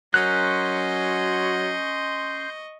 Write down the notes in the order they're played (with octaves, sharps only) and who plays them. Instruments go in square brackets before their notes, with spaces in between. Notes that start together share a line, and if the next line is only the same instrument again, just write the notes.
[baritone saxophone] F#3 [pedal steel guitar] C#4 A#4 F#6 [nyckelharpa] D#5 C#6 [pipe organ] C6 G6